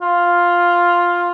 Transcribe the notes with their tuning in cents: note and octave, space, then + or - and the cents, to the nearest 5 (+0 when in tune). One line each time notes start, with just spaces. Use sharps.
F4 +5